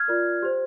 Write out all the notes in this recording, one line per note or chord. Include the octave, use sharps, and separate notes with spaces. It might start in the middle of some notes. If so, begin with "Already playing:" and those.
Already playing: F6 G#6
F4 A#4 D5
G4 C5